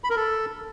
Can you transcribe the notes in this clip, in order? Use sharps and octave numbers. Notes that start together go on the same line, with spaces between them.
B5
A#4
A4